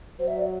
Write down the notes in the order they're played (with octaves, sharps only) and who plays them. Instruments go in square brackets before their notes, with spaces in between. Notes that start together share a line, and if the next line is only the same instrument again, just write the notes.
[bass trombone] F#3 [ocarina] C5
[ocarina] E5
D5